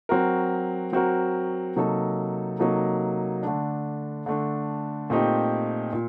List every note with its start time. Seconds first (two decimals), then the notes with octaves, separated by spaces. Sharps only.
0.09 F#3 C4 F#4 A#4
0.93 F#3 C4 F#4 A#4
1.76 C3 F#3 A#3 D#4 A4
2.59 C3 F#3 A#3 D#4 A4
3.43 D3 A3 D4
4.26 D3 A3 D4
5.10 A#2 A3 C4 D#4 G4
5.93 A#2